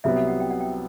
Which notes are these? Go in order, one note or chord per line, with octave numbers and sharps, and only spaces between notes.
C2 C3 F#3 B3 E5
F#5
F#5
G5
F#5
G5